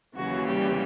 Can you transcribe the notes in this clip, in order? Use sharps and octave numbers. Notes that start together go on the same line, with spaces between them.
D#2 C#3 E3 F#3 F#4
G3 G4